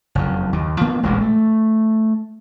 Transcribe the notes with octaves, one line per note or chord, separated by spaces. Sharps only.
F#1 F2
D#2
F3 A#3 B3
E1 A1 A#2 G#3
A3